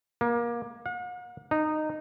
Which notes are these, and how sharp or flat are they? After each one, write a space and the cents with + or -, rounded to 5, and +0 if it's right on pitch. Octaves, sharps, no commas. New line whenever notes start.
A#3 +25
F#5 -45
D#4 -15